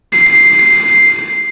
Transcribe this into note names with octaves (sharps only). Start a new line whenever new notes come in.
C7